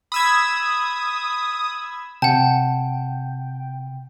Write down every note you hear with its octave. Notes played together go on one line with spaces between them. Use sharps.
B5 D#6 E6 G#6
C3 F#5 G5 A5